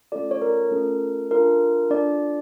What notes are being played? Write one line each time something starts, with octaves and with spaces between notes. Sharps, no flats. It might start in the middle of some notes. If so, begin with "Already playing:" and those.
A3 C#4 F4 A4 D5
C#5
A#4
A3 C#4 F4 A4
D4 F4 A4 A#4
D4 F4 A4 D5